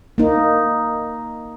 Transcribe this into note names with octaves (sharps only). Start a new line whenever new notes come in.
A#3 D#4